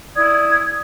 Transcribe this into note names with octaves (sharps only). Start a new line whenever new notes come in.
E4 D5 D#6 G#6